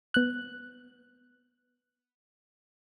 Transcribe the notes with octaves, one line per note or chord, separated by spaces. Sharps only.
B3 F#6